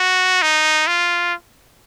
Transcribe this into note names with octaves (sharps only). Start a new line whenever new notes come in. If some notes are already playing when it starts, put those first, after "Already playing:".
Already playing: F#4
D#4
F4